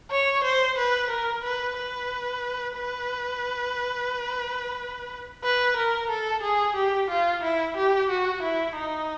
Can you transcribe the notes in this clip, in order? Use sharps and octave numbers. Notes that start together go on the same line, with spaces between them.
C#5
C5
B4
A#4
B4
B4
B4
B4
A#4
A4
G#4
G4
F4
E4
G4
F#4
E4
D#4